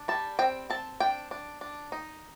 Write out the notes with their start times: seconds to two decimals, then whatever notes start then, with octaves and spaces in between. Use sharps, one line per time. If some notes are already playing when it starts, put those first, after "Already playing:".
Already playing: D4
0.08 G3 A5
0.39 C4 G5
0.70 C4 A5
1.00 D4 G5
1.31 D4
1.61 D4
1.92 D#4